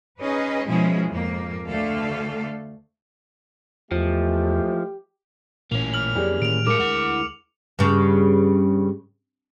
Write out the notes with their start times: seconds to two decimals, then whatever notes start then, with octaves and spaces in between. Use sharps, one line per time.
0.20 C#4 D#4 G#4 B4 D#5
0.68 B2 F3 G#3 C#4 E4 G#4
1.08 F2 G#2 A#3
1.67 D2 D3 A3 A4 F5
3.91 E2 E3 F3 G#3 A3 G4
5.72 A1 A#2 A#3 C#4 F7
5.94 F6 F#7
6.15 F2 F#3 G4 G#4 D5
6.42 A2 D#3 E3 D7 F7
6.67 A2 D#3 G#3 A#4 F5 D6 C#7
6.80 D2 E4 F#5
7.79 G2 C#3